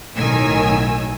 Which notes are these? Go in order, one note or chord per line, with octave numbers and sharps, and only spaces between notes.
B1 A2 D#3 G#5 E6